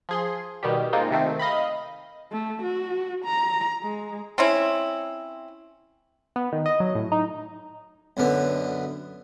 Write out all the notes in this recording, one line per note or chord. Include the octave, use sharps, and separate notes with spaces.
F3 G#4 C6
B2 D#3 G3 G4
G#3 A#3 C4 D#4 F4
C3 D#3 A3 C4
D#5 F5 B5
A3
F#4
A#5
G#3
C4 C#4 E4
B3
D#3
D#5
F#3
A2
D#4
B1 F#2 D3 B3